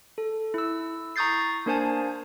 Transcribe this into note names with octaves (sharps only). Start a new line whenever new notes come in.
A4
E4 E6
A#5 C#6 D#6 G6 A6 C7
A#3 D4 A#4 C5 G#5 A5